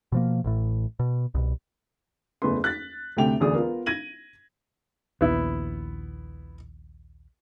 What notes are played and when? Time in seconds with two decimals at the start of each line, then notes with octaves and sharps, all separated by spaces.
0.12 B2 F3 A#3
0.44 A1 A2
0.99 B2
1.34 C2 B2
2.42 F#1 E2 A3 B4 C6
2.64 F#6 A6 B6
3.17 D2 C3 A3 G5 F7
3.40 E1 D2 G#4 D5 D#6
3.54 B3 F4 A#4
3.86 G#6 A#6 D#7 F#7
5.21 A#1 D#2 B3 E4